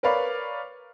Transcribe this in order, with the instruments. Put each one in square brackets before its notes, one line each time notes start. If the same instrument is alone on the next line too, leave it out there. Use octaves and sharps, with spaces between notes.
[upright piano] A#4 B4 C#5 D5 F5 B5